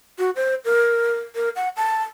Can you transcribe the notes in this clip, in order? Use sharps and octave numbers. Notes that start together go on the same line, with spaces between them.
F#4
C5
A#4
A#4
F#5
A5